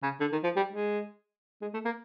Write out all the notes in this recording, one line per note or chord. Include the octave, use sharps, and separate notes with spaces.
C#3
D3
D#3
F3
G3
G#3
G#3
A3
A#3